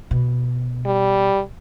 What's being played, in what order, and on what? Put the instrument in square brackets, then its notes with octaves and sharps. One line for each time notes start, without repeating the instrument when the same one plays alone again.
[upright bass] B2
[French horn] G3